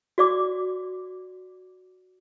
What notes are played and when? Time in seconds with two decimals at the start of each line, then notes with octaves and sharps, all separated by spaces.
0.18 F#4 D5 D6